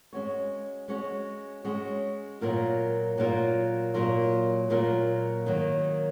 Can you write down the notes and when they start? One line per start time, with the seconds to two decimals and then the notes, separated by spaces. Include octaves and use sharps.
0.13 G#3 C#4 F#4 C#5
0.88 G#3 C#4 F#4 C#5
1.64 G#3 C#4 F#4 C#5
2.41 A#2 F#3 A#3 F4 A#4
3.18 A#2 F#3 A#3 F4 A#4
3.94 A#2 F#3 A#3 F4 A#4
4.70 A#2 F#3 A#3 F4 A#4
5.46 D#3 F#3 A#3